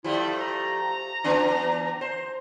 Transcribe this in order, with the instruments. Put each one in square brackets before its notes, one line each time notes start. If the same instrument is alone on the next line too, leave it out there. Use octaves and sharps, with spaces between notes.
[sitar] F3 G3 A3 [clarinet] E4
[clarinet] A#5
[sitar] E3 B3 D4
C5